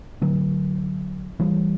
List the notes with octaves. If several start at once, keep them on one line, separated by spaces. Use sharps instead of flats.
D3 F#3
E3 G3